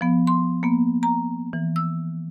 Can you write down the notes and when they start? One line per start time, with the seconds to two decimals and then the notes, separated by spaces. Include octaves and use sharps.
0.01 F3 B3
0.27 C6
0.63 A#3 B3
1.03 A#5
1.53 E3
1.76 E6